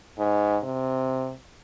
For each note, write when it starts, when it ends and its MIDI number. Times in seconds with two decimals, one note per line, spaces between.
0.19 0.57 44
0.63 1.32 48